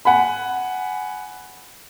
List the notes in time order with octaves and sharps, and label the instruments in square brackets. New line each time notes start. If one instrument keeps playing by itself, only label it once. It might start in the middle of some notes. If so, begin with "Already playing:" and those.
[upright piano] F#5 G#5 B5